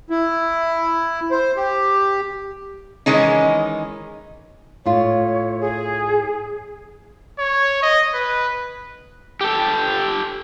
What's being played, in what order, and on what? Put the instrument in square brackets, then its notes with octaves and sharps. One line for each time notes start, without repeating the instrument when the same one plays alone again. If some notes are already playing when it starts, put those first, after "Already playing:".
[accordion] E4
C5
G4
[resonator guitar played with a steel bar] D#3 E3 G#3 C#4 D#4
[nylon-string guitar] A2 F4 [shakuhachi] C#5
[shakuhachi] G#4
[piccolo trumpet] C#5
D#5
B4
[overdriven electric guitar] G4 A4